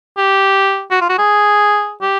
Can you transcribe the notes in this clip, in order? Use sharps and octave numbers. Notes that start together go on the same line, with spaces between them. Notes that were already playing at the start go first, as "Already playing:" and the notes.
G4
F#4
F4
F#4
G#4
G4